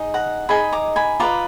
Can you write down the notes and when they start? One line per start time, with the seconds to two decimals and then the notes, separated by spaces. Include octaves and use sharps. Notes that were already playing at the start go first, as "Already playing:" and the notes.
Already playing: D#4 G#4 D#5
0.14 F#5 A#5
0.49 D#4 G#4 D#5 G#5 B5
0.72 A#5 D6
0.96 G#5 B5
1.20 F4 B4 D#5 A#5 D6